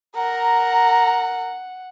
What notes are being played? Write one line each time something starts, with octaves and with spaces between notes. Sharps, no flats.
A#4 F#5 A#5